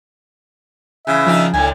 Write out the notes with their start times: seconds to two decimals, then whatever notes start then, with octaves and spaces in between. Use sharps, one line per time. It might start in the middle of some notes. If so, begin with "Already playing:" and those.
1.07 C#3 E3 E5
1.27 D#3 F3 D4 D#4
1.54 C#2 A2 D3 D#3 G#5